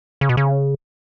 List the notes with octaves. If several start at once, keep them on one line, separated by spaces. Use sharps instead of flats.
C#3
B2
C#3